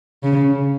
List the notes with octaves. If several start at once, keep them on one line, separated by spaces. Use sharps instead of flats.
C#3